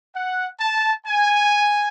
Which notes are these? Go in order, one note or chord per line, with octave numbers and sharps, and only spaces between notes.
F#5
A5
G#5